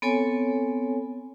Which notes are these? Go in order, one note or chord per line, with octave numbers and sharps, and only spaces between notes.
B3 C4 A4 C#5 G#5